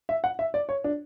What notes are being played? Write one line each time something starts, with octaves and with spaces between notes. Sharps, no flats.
E5
F#5
E5
D5
C#5
D4